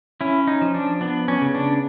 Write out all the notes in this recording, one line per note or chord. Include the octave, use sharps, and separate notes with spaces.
C#4 E4
D#4
F3
D4
B3 D4
C#4
C#3
D4